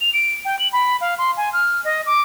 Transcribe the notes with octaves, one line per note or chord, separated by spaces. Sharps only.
F7
D7
G5
F#7
B5
F5
C6
G#5
F6
D#5
D6